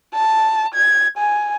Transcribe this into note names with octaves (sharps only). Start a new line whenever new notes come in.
A5
G#6
G#5